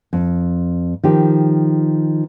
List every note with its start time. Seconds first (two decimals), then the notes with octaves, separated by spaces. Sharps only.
0.13 F2
1.04 D#3 F3 G4